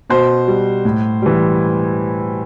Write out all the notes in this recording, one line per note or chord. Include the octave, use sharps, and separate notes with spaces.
B2 C5
G3
A2
E3 G3